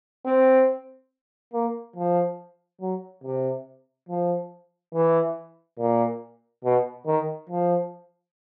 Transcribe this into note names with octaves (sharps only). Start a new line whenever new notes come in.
C4
A#3
F3
F#3
C3
F3
E3
A#2
B2
D#3
F3